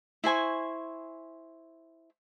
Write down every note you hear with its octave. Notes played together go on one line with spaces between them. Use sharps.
E4 C5 G#5 C#6